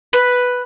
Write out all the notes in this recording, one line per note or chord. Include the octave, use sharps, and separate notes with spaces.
B4